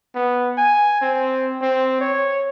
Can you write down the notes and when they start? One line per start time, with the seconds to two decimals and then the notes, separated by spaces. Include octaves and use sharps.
0.15 B3
0.58 G#5
1.01 C4
1.62 C4
2.01 C#5